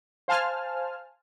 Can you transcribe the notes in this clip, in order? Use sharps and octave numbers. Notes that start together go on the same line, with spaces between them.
C5 F5 G#5 A5 F6